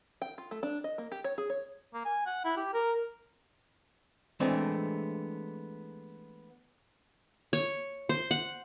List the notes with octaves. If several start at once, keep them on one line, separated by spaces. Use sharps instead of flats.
G5
F4
A3
D4
D#5
A#3
G4
C#5
G#4
C#5
A#3
G#5
F#5
E4
G4
A#4
E3 G#3 A3 B3 C4 D4
C#5
C5
F#5